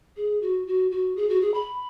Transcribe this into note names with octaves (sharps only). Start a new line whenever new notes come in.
G#4
F#4
F#4
F#4
G#4
F#4
G#4
B5